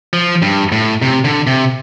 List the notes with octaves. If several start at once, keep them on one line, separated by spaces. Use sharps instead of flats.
F3
G2
A2
C3
D3
C3